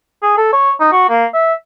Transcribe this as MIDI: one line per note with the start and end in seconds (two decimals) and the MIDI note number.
0.22 0.34 68
0.37 0.50 69
0.52 0.72 73
0.80 0.88 63
0.92 1.09 66
1.09 1.25 58
1.34 1.53 76